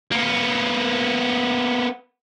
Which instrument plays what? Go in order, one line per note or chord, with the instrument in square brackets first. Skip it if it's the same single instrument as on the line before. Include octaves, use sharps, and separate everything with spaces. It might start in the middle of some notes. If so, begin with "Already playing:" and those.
[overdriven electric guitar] A#3 B3